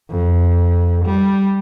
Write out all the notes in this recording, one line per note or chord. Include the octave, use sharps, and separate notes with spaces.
F2
G3